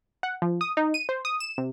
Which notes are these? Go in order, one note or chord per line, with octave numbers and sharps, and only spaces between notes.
F#5
F3
D#6
D#4
D#7
C5
D#6
E7
C3